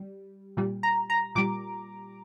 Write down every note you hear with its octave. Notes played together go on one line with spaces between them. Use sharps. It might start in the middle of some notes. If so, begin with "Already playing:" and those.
Already playing: G3
A#2 G3
A#5
A#5
A#2 G3 D6